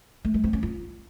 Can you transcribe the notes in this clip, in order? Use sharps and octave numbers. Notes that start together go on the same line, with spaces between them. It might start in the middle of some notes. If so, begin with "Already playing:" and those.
A3
G#3
C4
C#4
F4